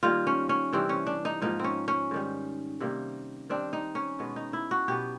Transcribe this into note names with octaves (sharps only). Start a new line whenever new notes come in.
D#3 G3 A#3 F4
C#4
C#4
C3 E3 G3 C4
C#4
D4
D#4
G#2 F3 A#3 D#4
C4 C#4
C#4
G#2 D#3 G3
C3 D#3 G3 A#3
D#3 G3 C4 D4
D#4
C#4
B2 G#3 B3
D#4
E4
F#4
B2 F#3 B3 G4